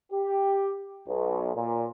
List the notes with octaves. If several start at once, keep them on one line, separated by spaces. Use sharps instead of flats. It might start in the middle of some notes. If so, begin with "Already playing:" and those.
G4
B1
A#2